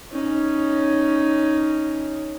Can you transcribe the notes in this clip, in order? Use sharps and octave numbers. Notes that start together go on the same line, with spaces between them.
C#4 D#4